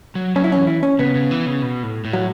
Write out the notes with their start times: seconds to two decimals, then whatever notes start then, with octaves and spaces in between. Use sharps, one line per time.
0.15 F#3
0.36 F#3 C#4
0.44 E4
0.52 E3 C#4
0.67 E4
0.83 C#4
0.99 C#3 B3
1.15 C#3
1.31 E3
1.46 C#3
1.62 B2
1.83 A2
2.05 A2
2.13 F#3